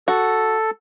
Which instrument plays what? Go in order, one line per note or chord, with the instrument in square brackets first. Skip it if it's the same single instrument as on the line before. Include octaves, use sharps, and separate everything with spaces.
[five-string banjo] F#4 [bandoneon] A4